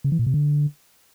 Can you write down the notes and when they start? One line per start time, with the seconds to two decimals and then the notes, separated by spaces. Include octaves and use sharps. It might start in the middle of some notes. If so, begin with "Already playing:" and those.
0.04 C#3
0.12 E3
0.19 A#2
0.27 C3
0.34 D3